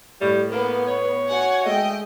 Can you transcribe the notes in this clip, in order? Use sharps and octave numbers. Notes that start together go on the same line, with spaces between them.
A2 G3
A#3 B3
C#5
F#4 F#5 G#5
G#3 A3 D#5 G5